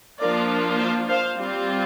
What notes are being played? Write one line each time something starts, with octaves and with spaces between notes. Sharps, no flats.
F3 A#3 D4 F4 A#4 D5
C5 F5
C5 F5
G3 C4 F4